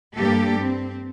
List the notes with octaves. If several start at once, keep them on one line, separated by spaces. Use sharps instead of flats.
G2 A#3 G4 A4
C4